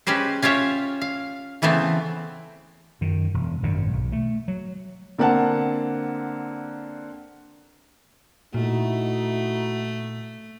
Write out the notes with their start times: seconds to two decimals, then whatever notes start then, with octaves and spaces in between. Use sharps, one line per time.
0.07 G#3 C#4 G4 B4 C5
0.42 C#4 F4 G4 C#5 E5
1.02 F5
1.62 C#3 E3 A3 B3 C4
3.01 F#2 D#3
3.34 E1
3.63 G#1 F#2 D3
3.93 B1
4.12 A3
4.48 F#3
5.18 D3 A#3 C4 F#5 A5
8.54 A#2 A3 D#4 E4 F#4